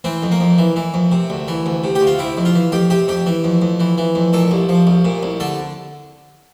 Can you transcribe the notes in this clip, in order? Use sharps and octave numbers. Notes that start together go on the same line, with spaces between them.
E3 C4
F2
A#3
F2
E3
E3
F2
C3
D2
E3
D2
C3
G4
D2
F4
C3 E4
F2
F4
E3
F2 G4
C3 G4
F2 G4
E3
F2
F2
E3
E3
F2
A#2 A4
C2
F3
C2
A#2
C2
D3 A4